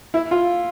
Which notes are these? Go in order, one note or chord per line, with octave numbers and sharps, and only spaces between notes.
E4
F4